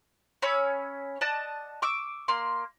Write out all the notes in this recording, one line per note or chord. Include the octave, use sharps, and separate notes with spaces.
C#4 C#5 B5 E6
D5 D#5 F#5 A5
C#6 D6 E6
A#3 C6